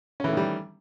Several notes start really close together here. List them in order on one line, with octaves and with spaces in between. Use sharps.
C#4 E3 A3 D#3 G3